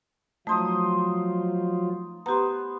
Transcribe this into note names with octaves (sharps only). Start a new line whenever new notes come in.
F3 F#3 A3 D#4 F4 C5 D#6
B3 G4 C5 A#5